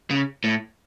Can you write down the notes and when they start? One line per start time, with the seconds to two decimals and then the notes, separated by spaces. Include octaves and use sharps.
0.11 C#3
0.44 A2